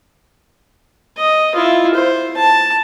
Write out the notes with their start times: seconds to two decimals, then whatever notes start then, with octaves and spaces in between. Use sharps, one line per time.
1.18 D#5
1.55 E4 F4
1.94 C5
2.37 A5